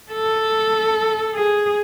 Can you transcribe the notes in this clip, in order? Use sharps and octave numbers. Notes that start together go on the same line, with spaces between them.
A4
G#4